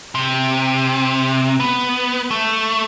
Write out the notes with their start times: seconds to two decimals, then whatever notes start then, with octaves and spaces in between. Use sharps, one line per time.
0.15 C3
1.60 B3
2.31 A3